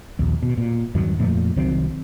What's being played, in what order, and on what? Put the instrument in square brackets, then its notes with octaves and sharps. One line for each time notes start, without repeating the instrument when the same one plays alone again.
[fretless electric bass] A#1 D#2
B2
A#2
E2 G2 D#3 F#3
F2 A#2 F3 A3
C2 D#3 F#3 C4